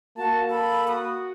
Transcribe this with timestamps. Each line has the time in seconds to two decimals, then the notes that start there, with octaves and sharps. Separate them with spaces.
0.17 A#3 F#4 A5
0.50 A4 B5
0.88 F#4 D#6